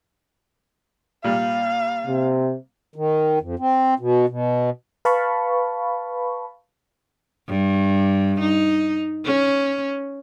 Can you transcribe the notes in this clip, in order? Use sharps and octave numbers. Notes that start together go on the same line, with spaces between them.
A#2 G3 F5
C3
D#3
F2
C4
B2
B2
B4 F5 A5 B5 C#6
G2
D#4
C#4